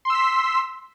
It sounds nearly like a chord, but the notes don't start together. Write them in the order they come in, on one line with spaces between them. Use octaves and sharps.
C6 E6 B6